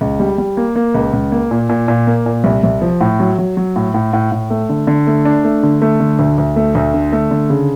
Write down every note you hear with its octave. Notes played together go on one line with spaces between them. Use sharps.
C#2
G3
G3
A#3
A#3
C#2
C#2
A#3
A#2
A#2
A#2
A#3
A#2
C2
C2
F3
A2
F#3
F#3
F#3
A2
A2
A2
A2
A3
D3
D3
A3
D4
A3
D3
A3
D3
D2
D2
A3
D2
D3
A3
D3
C#3